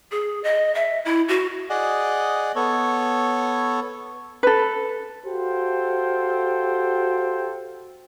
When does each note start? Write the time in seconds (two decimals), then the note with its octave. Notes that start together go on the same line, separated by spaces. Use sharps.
0.11 G#4
0.44 D#5
0.75 E5
1.05 E4
1.28 F#4
1.70 G#4 D5 D#5 F#5
2.56 B3 A4 C#5
4.43 A4 B4
5.26 F#4 G4 A4 C5 F5 G5